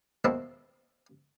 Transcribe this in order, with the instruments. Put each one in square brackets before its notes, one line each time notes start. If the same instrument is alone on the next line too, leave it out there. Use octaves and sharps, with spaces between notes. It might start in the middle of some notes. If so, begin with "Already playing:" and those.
[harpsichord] D#2 B2 C4 E4 E5 A5